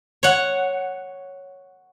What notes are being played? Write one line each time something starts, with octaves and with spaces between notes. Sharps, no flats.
C#5 F#5